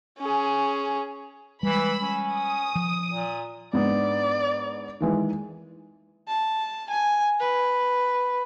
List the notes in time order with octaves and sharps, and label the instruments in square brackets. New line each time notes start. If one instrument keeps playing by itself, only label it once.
[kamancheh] C#4 G#4
[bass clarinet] E3 [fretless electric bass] G3 G#3 [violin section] B5 E6
[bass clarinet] C#4
[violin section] D#6
[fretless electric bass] F3
[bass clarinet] A#2
[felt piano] G#2 B3 D4 [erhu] D5
[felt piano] D#3 E3 G#3
[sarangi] A5
G#5
B4